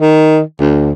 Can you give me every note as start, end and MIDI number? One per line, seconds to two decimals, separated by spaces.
0.01 0.41 51
0.60 0.92 38